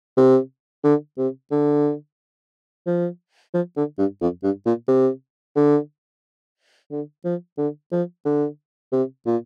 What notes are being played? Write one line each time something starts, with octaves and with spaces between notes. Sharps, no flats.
C3
D3
C3
D3
F3
F3
D3
G2
F2
G2
A#2
C3
D3
D3
F3
D3
F3
D3
C3
A#2